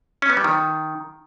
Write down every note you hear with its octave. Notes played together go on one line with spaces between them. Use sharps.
C#4
B3
G3
D#3